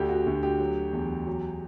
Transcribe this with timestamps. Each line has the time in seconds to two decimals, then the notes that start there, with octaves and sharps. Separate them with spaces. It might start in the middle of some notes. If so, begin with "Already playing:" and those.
Already playing: D2 D3 G4
0.09 F#4
0.26 D2
0.43 G4
0.60 F#3
0.93 E2
1.27 F#3